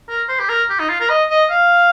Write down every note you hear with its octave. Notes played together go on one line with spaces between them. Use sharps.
A#4
C5
G4
A#4
G4
D#4
F4
A#4
D#5
D#5
F5